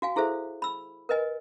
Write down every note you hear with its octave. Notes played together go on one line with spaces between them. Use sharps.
F#4 F5 G#5
E4 G#4 A4 C5 E5
B5 E6
A#4 B4 D#5 G#5